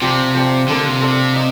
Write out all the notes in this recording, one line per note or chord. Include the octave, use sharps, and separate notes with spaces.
C3 F3 C4 G4 D5
F3 C4 G4 D5
D3 A#3 D4 F4 A4
C3
A#3 D4 F4 A4
D#4